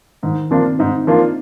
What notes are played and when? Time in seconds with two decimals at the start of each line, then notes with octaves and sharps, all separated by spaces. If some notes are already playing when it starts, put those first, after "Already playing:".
0.23 G#2 D#3
0.51 F3 A#3 C4 D4 F4
0.79 G#2 D#4
1.07 F3 A#3 D4 F4